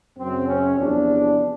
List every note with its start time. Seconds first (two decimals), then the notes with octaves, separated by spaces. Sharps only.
0.18 F#2 C#3 F#3 C4
0.48 C#4
0.77 E2 C3 F3 D4